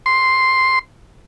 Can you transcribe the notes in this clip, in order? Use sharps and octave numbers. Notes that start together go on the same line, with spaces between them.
C6